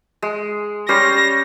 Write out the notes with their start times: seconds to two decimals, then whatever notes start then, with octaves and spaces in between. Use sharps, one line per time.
0.22 G#3
0.89 G3 C#4 C5 A#6